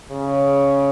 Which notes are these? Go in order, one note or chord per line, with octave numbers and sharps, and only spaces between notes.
C#3